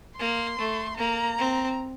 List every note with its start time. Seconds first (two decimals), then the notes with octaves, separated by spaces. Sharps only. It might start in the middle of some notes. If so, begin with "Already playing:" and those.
0.18 A#3 C6
0.59 A3
0.97 A#3 A#5
1.38 C4